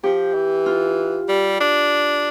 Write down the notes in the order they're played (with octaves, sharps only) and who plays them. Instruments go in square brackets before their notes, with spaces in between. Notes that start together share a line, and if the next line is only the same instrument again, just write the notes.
[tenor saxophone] F3 [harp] G4
[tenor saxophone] E3
[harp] F4
[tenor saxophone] G3
D4